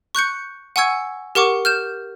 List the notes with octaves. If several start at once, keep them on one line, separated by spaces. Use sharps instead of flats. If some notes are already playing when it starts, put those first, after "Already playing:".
C#6 F#6 G6 C#7
F#5 G#5 C#6 E6 G#6
G4 A#4 F#5 C#6 D6
F6 G6 E7